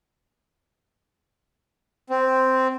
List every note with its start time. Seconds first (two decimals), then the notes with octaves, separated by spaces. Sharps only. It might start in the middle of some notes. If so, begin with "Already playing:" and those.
2.10 C4